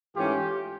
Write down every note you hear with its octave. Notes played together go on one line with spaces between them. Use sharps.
G#2 E3 A3 C#4 F4 G4